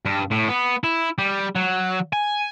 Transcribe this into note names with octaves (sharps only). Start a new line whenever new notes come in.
G2
A2
B3
E4
G3
F#3
G#5